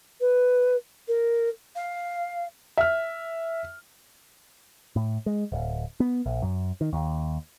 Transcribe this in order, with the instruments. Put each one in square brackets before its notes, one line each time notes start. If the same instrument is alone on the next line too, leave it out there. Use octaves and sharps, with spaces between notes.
[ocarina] B4
A#4
F5
[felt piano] E5 F6
[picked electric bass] A2
G#3
D1
B3
A#1
F#2
D#3
D#2